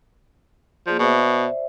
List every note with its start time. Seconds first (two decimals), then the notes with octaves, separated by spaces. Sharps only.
0.87 F3 A#3 G#4 D5
0.99 B2 C5 D5 E5